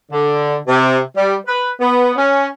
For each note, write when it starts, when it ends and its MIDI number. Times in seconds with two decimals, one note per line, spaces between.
0.11 0.55 50
0.67 0.96 48
1.16 1.33 55
1.45 1.68 71
1.80 2.10 59
2.16 2.45 61